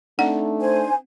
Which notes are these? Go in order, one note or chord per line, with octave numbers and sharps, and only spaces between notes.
A3 C4 D4 D#4 D5 F#5
C5 G#5